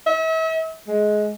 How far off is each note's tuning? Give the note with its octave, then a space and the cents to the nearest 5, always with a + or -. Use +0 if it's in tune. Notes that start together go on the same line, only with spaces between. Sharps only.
E5 -40
G#3 +20